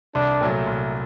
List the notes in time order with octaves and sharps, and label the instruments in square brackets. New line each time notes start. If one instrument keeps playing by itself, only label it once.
[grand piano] C2 [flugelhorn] D4
[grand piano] A#2 F#3 A3
C2